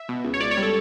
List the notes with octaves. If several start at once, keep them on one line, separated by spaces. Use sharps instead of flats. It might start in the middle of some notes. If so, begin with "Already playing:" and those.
Already playing: E5
B2
C#2
C#5
C#2 D5
C#5
G3
A4